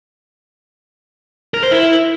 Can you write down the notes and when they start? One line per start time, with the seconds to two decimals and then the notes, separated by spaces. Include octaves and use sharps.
1.54 A#4
1.63 C5
1.71 E4